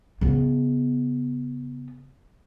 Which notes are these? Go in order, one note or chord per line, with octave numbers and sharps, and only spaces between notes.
C#3 B3